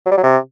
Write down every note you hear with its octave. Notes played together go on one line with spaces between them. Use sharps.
F#3
G3
F#3
C3